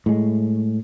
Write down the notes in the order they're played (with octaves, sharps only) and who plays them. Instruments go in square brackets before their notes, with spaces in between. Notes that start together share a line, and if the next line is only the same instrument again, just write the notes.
[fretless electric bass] A2 G#3